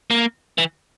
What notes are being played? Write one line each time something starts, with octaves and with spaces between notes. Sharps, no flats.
A#3
E3